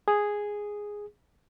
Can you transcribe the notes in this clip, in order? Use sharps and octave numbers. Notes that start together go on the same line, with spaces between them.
G#4